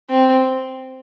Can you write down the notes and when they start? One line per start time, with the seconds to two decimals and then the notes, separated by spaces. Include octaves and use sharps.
0.10 C4